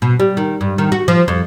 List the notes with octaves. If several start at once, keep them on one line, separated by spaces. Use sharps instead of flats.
B2
G3
D#3
G2
D#3
F#4
F3
F2